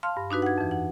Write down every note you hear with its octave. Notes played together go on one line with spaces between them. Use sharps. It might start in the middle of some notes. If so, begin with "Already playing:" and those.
F5 A5 C6 F6
G2
D4 D#4 F#4 B4
F#5 G#6
F2 E3
F#5